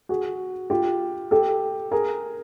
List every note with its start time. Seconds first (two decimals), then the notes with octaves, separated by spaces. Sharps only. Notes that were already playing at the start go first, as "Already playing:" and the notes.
0.09 F#4 G#4
0.70 F4 G4
1.31 G4 A4
1.91 G#4 A#4